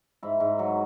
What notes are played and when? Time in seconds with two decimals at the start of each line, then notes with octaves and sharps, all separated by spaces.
0.23 G#2 E4
0.40 G#2
0.59 F#3